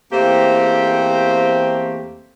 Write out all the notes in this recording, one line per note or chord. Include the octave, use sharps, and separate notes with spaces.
E2 A3 A#3 C4 G4 C5